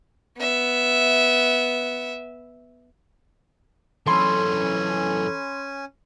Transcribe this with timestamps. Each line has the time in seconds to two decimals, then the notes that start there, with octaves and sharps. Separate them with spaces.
0.38 B3 E5
4.06 F#2 E3 C#4 A4 G#5 B5 C6